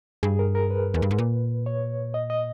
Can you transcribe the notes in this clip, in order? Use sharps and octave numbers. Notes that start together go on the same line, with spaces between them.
G2 G#4
A#4
A#4
B4
E2
G2
G#2
A#2
C#5
D#5
D#5